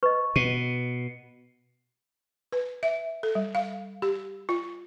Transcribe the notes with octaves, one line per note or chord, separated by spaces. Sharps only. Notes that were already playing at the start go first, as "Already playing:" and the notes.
B4 D#5 C#6
B2 D#7
B4
E5
A4
G3
F5
G4
F4